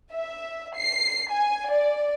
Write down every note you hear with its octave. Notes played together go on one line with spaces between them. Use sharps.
E5
C7
G#5
D5